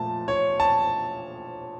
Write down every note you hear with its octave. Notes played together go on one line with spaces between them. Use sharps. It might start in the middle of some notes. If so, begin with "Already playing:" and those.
Already playing: A#2 F3 A3 A5
C#5
A5